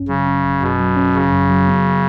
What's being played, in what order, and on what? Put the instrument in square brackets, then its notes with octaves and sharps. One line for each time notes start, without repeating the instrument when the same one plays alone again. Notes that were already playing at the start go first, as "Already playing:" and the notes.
Already playing: [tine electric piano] G#1 F#2 C#4
[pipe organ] C#3 [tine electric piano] F#3
[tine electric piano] C#4
G#1
[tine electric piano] F#2 [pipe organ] B2
[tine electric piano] F#3
C#4
[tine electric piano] G#1 [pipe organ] C#3
[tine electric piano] F#2
F#3
B3